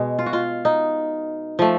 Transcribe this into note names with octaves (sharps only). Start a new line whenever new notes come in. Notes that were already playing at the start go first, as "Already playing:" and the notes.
Already playing: B2 G#3
F4
F#4
F4
D#4
F3 A3